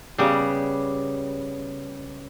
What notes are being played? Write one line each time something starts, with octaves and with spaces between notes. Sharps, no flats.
C#3 G3 B3 G4